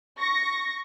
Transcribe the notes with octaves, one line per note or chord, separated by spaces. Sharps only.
C#6 A#6